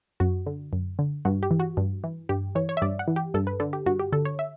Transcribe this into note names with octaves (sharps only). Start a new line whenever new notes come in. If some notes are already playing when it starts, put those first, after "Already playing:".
F#2 F#4
D3
F#2
D3
G2 F#4
G4
E3
F#4
G2
E3
G2 G4
E3 C#5
C#5
E5
G2 D5
F#5
E3
G4
G2 A4
B4
D3 A4
G4
G2 F#4
G4
D3 A4
C#5
E5